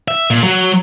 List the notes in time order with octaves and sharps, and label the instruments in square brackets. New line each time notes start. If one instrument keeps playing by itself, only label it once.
[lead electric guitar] E5
A#2
F#3